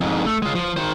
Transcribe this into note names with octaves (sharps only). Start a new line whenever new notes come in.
F2 G#2
A3
G#3 F4
F3
D#3 C5